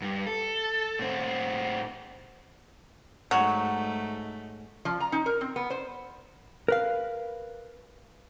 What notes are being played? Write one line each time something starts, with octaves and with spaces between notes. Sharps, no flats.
G2
A4
A2 C4
G#2 F#3 A3
F3
A#5
D#4
A#4
C4
B3
C5
A#4 B4 F5